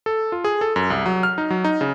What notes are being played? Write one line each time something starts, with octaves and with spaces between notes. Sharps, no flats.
A4
F4
G#4
A4
F#2
C2
F#3
F6
D#4
F#3
D#4
C#3